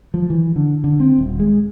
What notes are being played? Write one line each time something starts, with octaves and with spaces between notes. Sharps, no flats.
F3
E3
D3
D3
C4
D#1
G#3